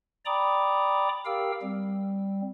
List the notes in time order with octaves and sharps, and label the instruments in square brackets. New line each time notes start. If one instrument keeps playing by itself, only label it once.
[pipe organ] D5 G5 A#5 B5 D6 D#6
G4 A#4 F5 G5 E6
G3 C4